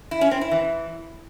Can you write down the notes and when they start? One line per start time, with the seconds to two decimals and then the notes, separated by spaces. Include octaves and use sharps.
0.11 E4
0.21 C#4
0.31 C4
0.41 E4
0.51 E3